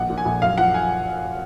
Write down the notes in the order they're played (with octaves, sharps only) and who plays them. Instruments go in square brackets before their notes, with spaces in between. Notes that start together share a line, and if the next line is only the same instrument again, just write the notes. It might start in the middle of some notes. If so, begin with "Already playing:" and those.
Already playing: [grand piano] A#1 F#5
A#2
G#5
A#1
F#2 F5
F3 F#5
G#5